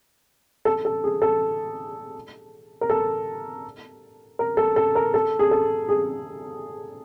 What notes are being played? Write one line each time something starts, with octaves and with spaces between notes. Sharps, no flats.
A4
A4
G#4
A4
A#4
A4
A#4
A4
A4
A#4
A4
G#4
A4
G#4